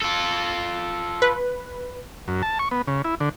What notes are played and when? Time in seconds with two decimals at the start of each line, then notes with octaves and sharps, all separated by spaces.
0.02 F4 A4
1.22 B4
2.28 F#2
2.43 A5
2.59 C#6
2.71 B3
2.88 C#3
3.05 E4
3.20 D3